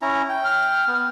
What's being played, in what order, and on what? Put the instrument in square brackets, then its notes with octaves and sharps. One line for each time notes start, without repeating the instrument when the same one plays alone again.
[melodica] C#4 E4 A#5
G5
[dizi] F6
[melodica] B3